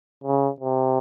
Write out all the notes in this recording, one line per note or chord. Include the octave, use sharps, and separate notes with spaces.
C#3
C3